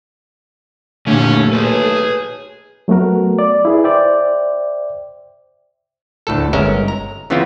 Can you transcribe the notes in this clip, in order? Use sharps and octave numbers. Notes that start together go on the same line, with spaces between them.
D#2 A#2 D3 A3 C#4
G#4 B4 C#5
F#3 A3 B3 F#4 A#4
D5
E4 G#4 B4
C5 D5 E5 G5
D2 A2 A4
G1 G#3 C#4 A#4 E5
A#5
C#3 E3 B3 C4 E4 F4